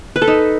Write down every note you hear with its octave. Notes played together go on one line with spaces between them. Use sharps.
B4
A4
D#4